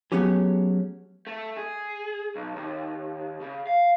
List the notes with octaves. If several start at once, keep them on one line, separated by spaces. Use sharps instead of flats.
F#3 A3 B3 C#4 G4 G#4
A3
G#4
B1
D#2
C#3
F5